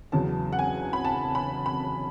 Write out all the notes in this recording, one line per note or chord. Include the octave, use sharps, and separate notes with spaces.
E2 C#3 F#3 A5
F#5
G#5
B5
A5
B5
B5